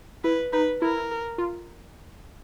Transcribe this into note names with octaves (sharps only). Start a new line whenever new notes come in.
E4 B4
D#4 B4
E4 A#4
F4